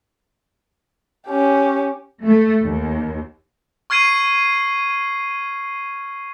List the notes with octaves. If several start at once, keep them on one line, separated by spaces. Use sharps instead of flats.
C#4 G4
A3
D#2
C#6 F6 G#6 C7 D#7